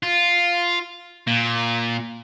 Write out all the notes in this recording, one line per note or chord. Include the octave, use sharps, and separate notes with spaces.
F4
A#2